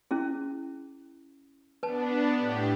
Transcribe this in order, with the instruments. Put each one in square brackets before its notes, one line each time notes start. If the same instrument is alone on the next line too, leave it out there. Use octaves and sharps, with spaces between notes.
[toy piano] C#4 E4 G#4
[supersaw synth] B3 D4 [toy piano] B4 A5
[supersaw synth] A2 G4